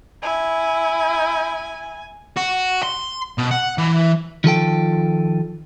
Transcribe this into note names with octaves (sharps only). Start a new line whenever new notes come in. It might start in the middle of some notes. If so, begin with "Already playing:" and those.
E4 G#5
F#4
C6
B2
F#5
E3
D#3 F3 A4 G5